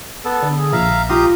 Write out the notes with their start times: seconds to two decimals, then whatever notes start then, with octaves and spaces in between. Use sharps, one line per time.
0.25 B3 A4
0.42 D3
0.59 G#4
0.73 A#1 E5 F5 A#5
1.09 F4 G4 A#5 D#6